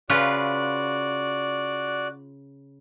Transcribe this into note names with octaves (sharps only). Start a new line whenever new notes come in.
C#3 F4 F#4 B4 D5